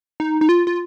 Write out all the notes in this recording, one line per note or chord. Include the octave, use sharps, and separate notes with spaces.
D#4
D#4
F4
F4